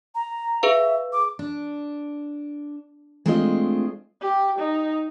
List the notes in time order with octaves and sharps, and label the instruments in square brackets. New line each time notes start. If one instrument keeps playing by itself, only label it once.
[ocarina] A#5
[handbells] G#4 B4 F5 [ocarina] E5
[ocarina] D6
[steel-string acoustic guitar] D4
G#3 A3 C4 D4 F4 D#5
[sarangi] G4
D#4